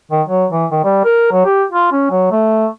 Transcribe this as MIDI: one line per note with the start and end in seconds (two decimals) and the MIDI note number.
0.11 0.22 51
0.28 0.46 54
0.51 0.66 52
0.72 0.80 51
0.84 1.01 55
1.05 1.31 70
1.32 1.44 54
1.45 1.64 67
1.72 1.89 65
1.92 2.08 61
2.11 2.27 54
2.31 2.67 57